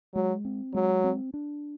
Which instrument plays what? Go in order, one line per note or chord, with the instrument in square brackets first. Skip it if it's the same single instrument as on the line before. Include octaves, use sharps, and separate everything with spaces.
[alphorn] F#3 [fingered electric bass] G#3
[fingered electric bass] C4
[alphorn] F#3 [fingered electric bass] G#3
[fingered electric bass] C4
D4